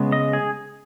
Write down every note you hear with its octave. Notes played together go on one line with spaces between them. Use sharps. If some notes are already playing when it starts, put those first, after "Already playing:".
Already playing: C#3 G#3 B3
D#5
G#4